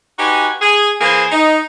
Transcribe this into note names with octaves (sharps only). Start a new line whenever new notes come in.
D#4 F#4 G4 B4 G#5
G#4
E3 A#3 G#4 C5 G#5
D#4